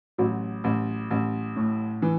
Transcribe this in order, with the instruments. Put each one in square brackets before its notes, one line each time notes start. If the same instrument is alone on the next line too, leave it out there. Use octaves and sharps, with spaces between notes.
[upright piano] A1 F#3
A1
A1
A2
E3